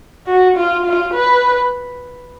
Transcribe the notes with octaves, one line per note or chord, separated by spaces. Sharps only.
F#4
F4
F4
B4